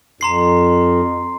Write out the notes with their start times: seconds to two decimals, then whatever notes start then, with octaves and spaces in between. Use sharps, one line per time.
0.21 F2 A#5 C6 C7